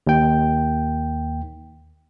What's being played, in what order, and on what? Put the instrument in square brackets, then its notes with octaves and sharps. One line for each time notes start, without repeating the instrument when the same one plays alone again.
[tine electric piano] D#2 G5